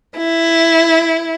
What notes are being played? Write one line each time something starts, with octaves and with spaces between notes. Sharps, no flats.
E4